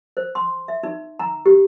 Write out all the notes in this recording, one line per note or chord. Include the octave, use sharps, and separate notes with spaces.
C5
C6
E5
D#4
A#5
G4